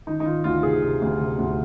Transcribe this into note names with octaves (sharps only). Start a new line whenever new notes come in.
D#3 D#4
D#4
D#3 F4
D2 F4
C3 G#4
C3
D2
C3
D2